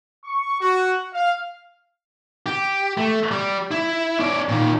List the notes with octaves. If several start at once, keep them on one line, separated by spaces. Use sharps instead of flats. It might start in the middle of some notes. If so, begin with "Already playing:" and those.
C#6
F#4
F5
G4
A3
G3
E4
C#4 D5
A#2 D#3